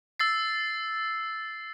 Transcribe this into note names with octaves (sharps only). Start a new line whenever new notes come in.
E6 A6 C7